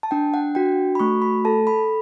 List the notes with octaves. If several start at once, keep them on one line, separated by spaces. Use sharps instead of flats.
A5
D4 G5
F#5
F#4 G5
B5
A3 C#6
B5
A4 A5
B5